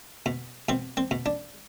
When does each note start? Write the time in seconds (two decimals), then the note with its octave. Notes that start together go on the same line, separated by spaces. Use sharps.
0.26 B2
0.69 B2 C4
0.97 C4
1.11 B2
1.26 D4